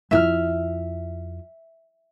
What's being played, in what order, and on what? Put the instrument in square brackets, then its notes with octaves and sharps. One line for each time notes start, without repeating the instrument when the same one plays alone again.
[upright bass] F2 E4 [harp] E5 F6